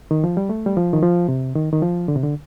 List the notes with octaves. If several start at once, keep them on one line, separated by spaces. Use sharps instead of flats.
D#3
F3
G3
A3
G3
F3
D#3
F3
C3
D#3
D#3
F3
D3
C3
D3